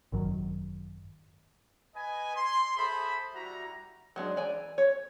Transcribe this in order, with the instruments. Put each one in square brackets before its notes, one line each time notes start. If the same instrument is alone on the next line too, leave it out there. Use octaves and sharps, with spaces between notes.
[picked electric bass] G#1 F#2 D#3 F#3
[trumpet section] B4 D#5 G#5
C6
G#4 A4 C5 E5 B5
G3 E4 F#4 A#5
[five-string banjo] F#3 G#3 D4
E3 D5 G#5 A#5
C#5